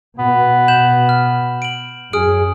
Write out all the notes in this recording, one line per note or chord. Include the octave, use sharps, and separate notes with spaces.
B2 B3
G6 E7 F#7
F6
D7 F#7
F#2 G#4 D#6 F6 D7